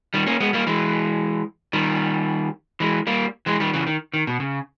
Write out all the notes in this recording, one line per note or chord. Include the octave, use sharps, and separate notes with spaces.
D#3 G3
A#3 C#4
G#3 B3
G3 A#3
E3 G#3
D#3 G3
E3 G#3
G3 A#3
E3 G#3
D#3 G3
C#3 E3
D#3
D#3
B2
C#3